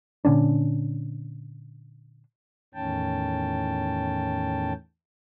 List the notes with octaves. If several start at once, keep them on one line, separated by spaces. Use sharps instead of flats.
A#2 D3 C#4 D4
E2 A2 D#3 C#4 G5 A5